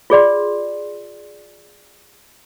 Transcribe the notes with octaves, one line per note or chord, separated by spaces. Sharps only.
F4 G#4 D5 C6